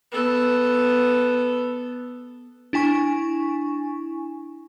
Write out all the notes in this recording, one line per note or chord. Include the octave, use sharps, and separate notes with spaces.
B3 A4
D4 E4 G#5 C#6